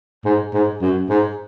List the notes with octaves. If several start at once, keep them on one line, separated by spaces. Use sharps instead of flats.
G#2
G#2
F#2
G#2